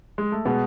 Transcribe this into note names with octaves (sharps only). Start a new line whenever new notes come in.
G#3
A3
B2 G#3 B3